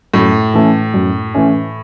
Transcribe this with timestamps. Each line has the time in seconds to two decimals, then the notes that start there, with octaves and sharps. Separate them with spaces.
0.14 F#2 A2
0.54 E3 A3 C#4
0.94 F#2
1.35 E3 A3 C#4